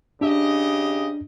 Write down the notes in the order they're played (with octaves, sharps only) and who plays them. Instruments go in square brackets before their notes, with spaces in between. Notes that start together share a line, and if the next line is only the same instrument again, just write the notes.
[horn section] C#3 G4 D#5 [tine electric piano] D4